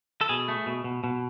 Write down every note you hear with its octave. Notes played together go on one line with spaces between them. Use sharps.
A4
B2 G#4
A3
B2
B2
B2